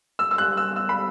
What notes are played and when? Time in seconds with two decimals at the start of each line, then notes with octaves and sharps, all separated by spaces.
0.19 E6
0.31 E6
0.38 F#6
0.57 E6
0.76 E6
0.89 B5